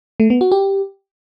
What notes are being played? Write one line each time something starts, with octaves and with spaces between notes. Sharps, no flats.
A3
B3
F#4
G4